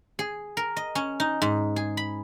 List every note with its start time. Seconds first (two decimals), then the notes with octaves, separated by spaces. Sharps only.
0.19 G#4
0.57 A#4
0.77 D#5
0.95 C#4
1.20 D#4
1.42 G#2
1.76 G#4
1.97 B5